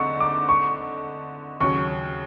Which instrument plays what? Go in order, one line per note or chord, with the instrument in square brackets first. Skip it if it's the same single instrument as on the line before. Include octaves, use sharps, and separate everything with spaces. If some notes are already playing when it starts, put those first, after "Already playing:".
Already playing: [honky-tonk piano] D3 A3 C4 D#4 [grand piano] C#6
[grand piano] D6
C#6
[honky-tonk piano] D#2 C#3 F#3 [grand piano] C#6